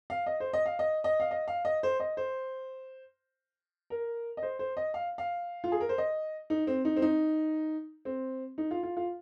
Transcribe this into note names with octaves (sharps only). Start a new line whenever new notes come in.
F5
D#5
C5
D#5
F5
D#5
D#5
F5
D#5
F5
D#5
C5
D#5
C5
A#4
D#5
C5
C5
D#5
F5
F5
F4
G#4
A#4
C5
D#5
D#4
C4
D#4
C4
D#4
C4
D#4
F4
F4
F4